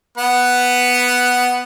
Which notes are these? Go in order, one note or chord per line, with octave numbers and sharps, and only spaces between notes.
B3 B4 F#5